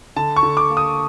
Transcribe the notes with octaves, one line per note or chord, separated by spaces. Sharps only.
D3 A5
C#6
D3
D6
A#3
D#6